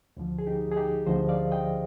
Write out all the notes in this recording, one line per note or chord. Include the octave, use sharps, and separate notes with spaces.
D2 D3 F3
G#4
D#4 G4
G#4
D#4 G4
D2 D3 F3 C5 D#5
D5 F5
D#5 G5